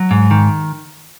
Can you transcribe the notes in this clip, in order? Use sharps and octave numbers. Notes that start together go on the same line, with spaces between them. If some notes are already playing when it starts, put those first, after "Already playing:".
Already playing: F#3
G#2
D#3